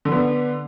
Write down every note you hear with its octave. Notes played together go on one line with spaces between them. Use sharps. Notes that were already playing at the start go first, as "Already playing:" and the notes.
D3 B3 D4